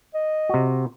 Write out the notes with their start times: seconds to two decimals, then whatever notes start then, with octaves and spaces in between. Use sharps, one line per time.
0.14 D#5
0.49 C3 F#4